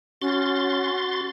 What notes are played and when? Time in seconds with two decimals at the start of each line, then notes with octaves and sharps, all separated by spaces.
0.22 C#4 F#4 C6 A6